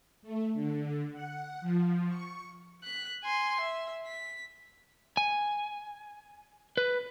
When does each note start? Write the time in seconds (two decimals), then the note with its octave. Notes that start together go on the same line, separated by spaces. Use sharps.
0.22 A3
0.54 D3
1.12 F#5
1.61 F3
2.08 C#6
2.83 F#6 B6
3.24 G#5 C6
3.61 E5
4.06 B6
5.17 G#5
6.77 B4